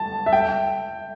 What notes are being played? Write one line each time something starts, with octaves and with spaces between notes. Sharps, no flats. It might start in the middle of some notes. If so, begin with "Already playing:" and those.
Already playing: A5
E5
G5